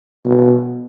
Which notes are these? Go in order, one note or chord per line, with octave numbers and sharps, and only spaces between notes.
B2